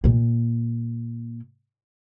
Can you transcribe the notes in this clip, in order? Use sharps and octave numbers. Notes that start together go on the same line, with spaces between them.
A#2 A#3